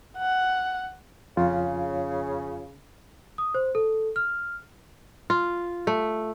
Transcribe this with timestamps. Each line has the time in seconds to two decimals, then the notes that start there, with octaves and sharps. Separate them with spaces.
0.18 F#5
1.37 F2 C#3 F4 F5
3.38 D#6
3.55 C5
3.75 A4
4.16 F6
5.30 F4
5.87 A3